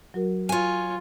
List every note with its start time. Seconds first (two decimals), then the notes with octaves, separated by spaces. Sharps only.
0.14 F#3 F#4 A#4
0.49 F4 C#5 G#5